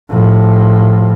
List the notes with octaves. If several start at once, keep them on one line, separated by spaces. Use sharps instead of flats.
A2 F3